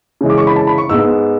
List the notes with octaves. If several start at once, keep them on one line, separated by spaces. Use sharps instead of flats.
C#3 E3 G#3
D6
C#6
B5
A5
B5
C#6
G#2 G#3 B3 E6